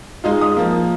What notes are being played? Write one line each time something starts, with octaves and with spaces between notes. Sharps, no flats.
G#3 D#4 F4
D#6
F3 A#3